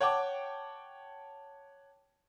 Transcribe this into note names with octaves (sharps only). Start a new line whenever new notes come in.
C#5 F#5 G5 A5 D6